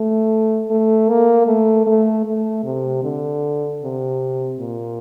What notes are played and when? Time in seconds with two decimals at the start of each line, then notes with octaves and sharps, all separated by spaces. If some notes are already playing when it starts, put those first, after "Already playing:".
Already playing: A3
0.71 A3
1.09 A#3
1.47 A3
1.86 A3
2.25 A3
2.64 C3
3.03 D3
3.82 C3
4.59 A#2